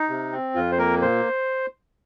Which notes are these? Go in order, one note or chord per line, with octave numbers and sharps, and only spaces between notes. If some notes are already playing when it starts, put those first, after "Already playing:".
Already playing: D#4
C3
C4
F2 F4
C5
A#3 A#4
A#2 C5